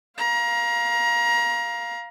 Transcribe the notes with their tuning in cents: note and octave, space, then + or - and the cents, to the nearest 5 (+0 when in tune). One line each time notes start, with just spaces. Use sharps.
F5 +0 A#5 +25